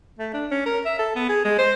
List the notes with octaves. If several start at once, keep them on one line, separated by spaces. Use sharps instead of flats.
A3
D4
C#4
A#4
E5
A4
B3
G#4
G#3
C5